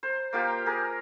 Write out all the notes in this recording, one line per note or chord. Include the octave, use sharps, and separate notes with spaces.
C5
A#3 F4 G4
G#4 A#4